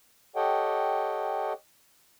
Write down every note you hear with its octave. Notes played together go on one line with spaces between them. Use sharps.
G4 A4 C#5 D#5 F#5 G5